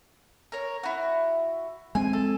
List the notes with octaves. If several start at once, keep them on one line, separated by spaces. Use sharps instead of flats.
A#4 C#5
E4 F#4
G#3 C4 G#5
A4